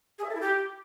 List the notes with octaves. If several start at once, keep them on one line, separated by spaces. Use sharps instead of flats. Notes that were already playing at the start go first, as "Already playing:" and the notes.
G#4
E5
A4
E4
G4